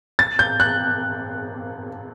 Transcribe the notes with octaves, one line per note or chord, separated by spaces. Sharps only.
A6
G6
F#6